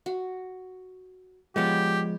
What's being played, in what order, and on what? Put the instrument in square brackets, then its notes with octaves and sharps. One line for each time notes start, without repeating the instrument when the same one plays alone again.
[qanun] F#4
[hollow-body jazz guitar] F3 G#3 [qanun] B3 C#5 D5 [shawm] G4